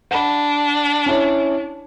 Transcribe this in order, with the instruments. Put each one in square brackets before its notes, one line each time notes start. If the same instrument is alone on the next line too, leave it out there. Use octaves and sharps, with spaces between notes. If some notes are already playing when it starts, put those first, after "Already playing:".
[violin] D4 [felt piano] F#5 B5
[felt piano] C#4 E4 C#5